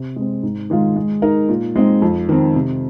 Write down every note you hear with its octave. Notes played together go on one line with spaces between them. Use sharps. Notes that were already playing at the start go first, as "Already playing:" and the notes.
Already playing: C3
G#3 C4
G#2
D#3 G#3 F4
G#3
D#4 A#4
A#2
G#3 C4 D#4
F2
D#3 C4
C3